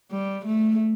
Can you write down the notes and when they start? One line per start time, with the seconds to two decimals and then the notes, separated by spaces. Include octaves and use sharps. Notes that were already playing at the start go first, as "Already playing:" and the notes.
0.11 G3
0.46 A3